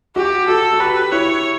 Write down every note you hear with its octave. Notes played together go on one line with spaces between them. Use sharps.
F#4 G4
F#4 A4
F#4
G4 B4
E4 C#5